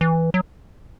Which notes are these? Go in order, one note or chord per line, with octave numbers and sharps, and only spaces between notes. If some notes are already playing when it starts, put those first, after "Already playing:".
E3
F#3